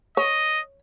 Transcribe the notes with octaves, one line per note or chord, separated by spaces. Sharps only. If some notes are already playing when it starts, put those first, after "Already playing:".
C#5 D#5